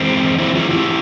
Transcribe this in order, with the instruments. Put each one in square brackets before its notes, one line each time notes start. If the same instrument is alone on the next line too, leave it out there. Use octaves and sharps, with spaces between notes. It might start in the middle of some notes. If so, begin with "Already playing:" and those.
Already playing: [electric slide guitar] E2 E3 G#3 C4
C4 E4
F4 G#4
E4 G4